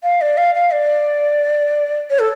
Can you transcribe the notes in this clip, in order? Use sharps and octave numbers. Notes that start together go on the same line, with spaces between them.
F5
D5
F5
F5
D5
C#5
A4